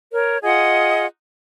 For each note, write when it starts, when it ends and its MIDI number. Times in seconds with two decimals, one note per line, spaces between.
0.12 0.38 70
0.12 0.38 73
0.43 1.06 65
0.43 1.06 68
0.43 1.06 75
0.43 1.06 78